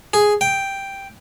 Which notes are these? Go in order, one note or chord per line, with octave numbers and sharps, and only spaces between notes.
G#4
G5